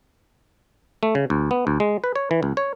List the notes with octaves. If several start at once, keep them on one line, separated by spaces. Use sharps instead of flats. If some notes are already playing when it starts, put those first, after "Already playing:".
A3
C#3
D2
B3
D2
G#3
B4
C#5
E3
C#2
C#5